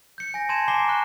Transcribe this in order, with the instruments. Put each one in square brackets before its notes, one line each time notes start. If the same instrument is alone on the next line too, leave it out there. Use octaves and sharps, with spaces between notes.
[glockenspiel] G6 C#7
G#5 A#6
A5 C6 G#6 E7
G#5 A#5 D6 C7 G7
C#6 F#6